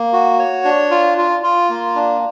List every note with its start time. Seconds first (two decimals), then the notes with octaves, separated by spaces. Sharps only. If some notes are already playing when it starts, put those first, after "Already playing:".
Already playing: A#3
0.13 F#4
0.39 C#5
0.65 D4
0.91 F4
1.18 F4
1.43 F4
1.69 A#3
1.95 D4